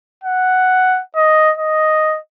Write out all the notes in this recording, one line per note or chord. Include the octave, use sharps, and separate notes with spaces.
F#5
D#5
D#5